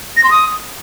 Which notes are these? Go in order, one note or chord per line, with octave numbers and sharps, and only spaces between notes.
A#6
C6
D#6